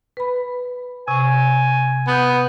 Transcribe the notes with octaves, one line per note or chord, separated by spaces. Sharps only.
B4 B5
C3 G#5 C#6
B3 B5 D#6 G6